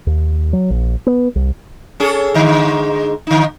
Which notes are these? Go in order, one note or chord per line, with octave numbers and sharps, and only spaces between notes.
D#2
F#3
A#1
B3
C2
C#4 G#4 A4
G#2 D3
D3 D#4